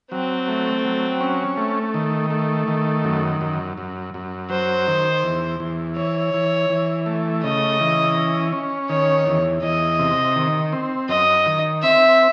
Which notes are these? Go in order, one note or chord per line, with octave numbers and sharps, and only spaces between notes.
F#3 C4
A3
F#3
C#4
A3
D#3
A3
D#3
F#2
F#2
F#2
F#2
F#3 C5
D#3
E2
E2
E3 C#5
E3
E3
A3
C#3 D#5
E3
C#4
C#4
D#3 C#5
E2
E2 D#5
C3
D#3
C4
F#2 D#5
D#3
C4 E5